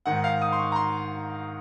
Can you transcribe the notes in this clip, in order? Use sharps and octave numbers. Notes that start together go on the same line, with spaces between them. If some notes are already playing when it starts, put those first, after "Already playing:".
G#2 D#3 F#5
F5
D#6
C6
C#6
A#5
C6